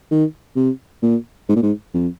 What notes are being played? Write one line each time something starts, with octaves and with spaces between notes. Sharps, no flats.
D#3
C3
A#2
G#2
A#2
G#2
F2